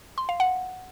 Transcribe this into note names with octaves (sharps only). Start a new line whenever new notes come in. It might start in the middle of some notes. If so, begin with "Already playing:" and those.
C6
F5
F#5